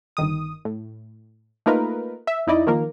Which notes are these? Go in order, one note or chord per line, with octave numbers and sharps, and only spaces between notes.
G1 D#3 D#6
A2
A3 A#3 D#4 F4 A#4 B4
E5
F2 D#4 E4 D5 D#5
D#3 F3 A#3 A#4